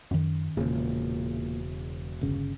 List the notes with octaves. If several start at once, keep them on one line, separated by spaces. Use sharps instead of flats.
F#2 D#3 C#4
E1 A#2 C#3
G1 C#3